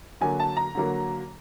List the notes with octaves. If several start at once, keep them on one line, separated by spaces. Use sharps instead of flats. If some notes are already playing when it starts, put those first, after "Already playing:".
D3 F#3 A#3 G#5
A5
A#5
D3 F#3 A#3